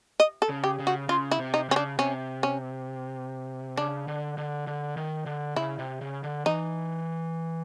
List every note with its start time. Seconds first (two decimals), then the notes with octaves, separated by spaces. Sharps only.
0.20 D#5
0.42 A4
0.49 C#3
0.64 G4
0.79 C#3
0.87 F#4
1.09 C#3 F4
1.31 E4
1.39 C3
1.54 D#4
1.69 C#3 C#4
1.76 D4
1.98 C3 C#4
2.43 C#4
3.77 C#3 D4
4.08 D3
4.38 D3
4.67 D3
4.97 D#3
5.26 D3
5.56 C#3 E4
5.79 C3
6.01 C#3
6.24 D3
6.46 E3 D#4